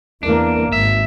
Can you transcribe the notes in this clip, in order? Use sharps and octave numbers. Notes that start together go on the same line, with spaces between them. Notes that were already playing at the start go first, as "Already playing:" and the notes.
E2 A#3 D4
G#1 E5